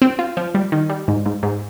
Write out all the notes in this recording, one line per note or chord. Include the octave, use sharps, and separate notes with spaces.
C4
F4
F3
G3
D#3
G3
G#2
G#2
G#2